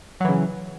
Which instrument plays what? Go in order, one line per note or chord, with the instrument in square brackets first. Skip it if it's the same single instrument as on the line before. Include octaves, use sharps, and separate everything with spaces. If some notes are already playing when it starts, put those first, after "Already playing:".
[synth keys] F#3
E3
C#3